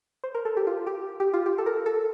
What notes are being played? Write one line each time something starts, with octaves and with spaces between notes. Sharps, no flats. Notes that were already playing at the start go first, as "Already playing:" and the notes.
C5
A#4
A4
G4
F4
G4
G4
F4
G4
A4
A#4
A4